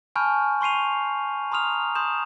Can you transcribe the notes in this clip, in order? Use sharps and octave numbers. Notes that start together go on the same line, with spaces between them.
G#5 A5 B5 C#6 F6 G6
C6 C#6 C7 D#7 F7
A#5 C6 D#6 F6 F7
C6 D#6 G6 E7